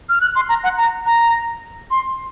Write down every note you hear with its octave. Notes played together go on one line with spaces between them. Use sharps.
F6
F#6
C6
A#5
F#5
A#5
A#5
C6